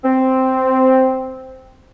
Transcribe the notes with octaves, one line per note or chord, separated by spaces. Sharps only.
C4